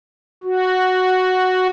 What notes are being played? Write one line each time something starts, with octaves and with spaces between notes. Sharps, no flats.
F#4